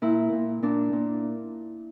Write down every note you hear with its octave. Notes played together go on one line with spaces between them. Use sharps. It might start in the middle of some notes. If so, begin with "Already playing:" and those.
A#2 E4
A#2
A#2 D4
A#2